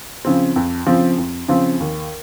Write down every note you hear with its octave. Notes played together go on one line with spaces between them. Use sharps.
C#3 F3 C4
F2
C#3 F3 C4
F2
C#3 F3 C4
D#2